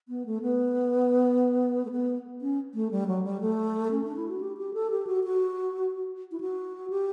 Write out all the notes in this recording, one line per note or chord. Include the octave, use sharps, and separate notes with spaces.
B3
A3
B3
A3
B3
C#4
A3
G3
F#3
G3
A3
C#4
D4
E4
F#4
G4
G4
A4
G4
F#4
F#4
E4
F#4
G4